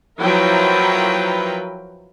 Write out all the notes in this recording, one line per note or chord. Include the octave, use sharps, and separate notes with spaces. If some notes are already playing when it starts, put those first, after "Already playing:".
F3 F#3 E4 A#4 B4 G5